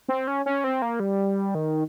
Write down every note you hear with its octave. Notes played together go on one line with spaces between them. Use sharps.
C4
C#4
C#4
C4
A#3
G3
D#3